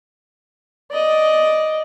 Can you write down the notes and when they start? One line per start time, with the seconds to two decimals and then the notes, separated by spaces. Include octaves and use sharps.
0.92 D5 D#5